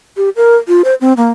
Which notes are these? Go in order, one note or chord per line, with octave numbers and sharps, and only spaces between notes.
G4
A#4
F4
C5
C4
A#3